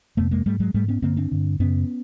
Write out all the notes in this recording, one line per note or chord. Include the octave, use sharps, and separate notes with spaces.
F2 C3 A3 B3
G#3 A#3
G#2 G3 A3
F#3 G#3
G#2 G3 A3
B3 C#4
G2 D3 A#3 C4
C4 D4
G2 D3
F#2 C#3 B3 C#4